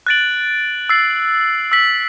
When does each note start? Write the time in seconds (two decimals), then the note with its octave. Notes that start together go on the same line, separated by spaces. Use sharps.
0.07 F#6 A6 D7 F#7
0.89 E6 A6 C7
1.72 E6 B6 F#7